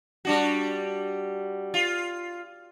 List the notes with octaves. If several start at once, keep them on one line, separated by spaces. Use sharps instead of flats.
G3 D4 F#4
F4